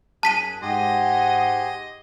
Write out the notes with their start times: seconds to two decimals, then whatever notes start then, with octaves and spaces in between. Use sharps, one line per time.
0.23 F#2 G#4 A5 F#6 B6 D#7
0.62 G#2 G4 D#5 F#5 G#5 C6
1.38 D#5